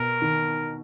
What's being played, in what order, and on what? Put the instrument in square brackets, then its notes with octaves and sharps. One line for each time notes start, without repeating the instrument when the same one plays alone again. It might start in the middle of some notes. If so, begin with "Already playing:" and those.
Already playing: [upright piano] B2 [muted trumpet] A#4
[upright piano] D#3